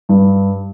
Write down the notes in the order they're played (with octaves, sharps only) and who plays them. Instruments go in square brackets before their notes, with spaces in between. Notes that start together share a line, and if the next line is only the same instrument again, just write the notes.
[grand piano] G2